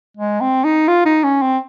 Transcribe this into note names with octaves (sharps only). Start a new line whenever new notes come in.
G#3
C4
D#4
F4
D#4
C#4
C4